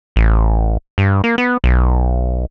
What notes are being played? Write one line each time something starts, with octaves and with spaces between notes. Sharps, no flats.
A1
G2
A#3
B3
B1